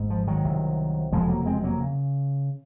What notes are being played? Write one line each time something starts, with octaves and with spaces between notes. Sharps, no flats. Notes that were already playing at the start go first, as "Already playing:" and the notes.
Already playing: G#1 G#2
F3
D#3 F#3
C2 C3
F#1 F2 C3 F3 G#3
F#3 A#3
G#3 C4
F#3 A#3
C#3